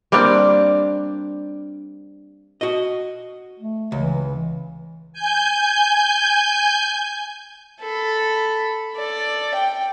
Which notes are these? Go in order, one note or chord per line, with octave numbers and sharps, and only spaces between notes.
G3 A#3 C4 D4
F#4 D#5
A3
C#2 E3
G#5 G6
A4 B5
A4 D5
G5